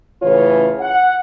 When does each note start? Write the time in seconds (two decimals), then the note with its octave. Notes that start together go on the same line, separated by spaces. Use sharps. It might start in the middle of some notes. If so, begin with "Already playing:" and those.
0.22 A2 C#3 E3 C#4 F4 C#5
0.80 F#5